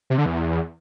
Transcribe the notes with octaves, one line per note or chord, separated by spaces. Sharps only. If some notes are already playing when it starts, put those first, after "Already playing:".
C3
D3
E2